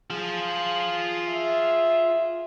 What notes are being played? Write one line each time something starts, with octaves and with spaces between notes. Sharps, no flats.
F4 G#4 A5
E5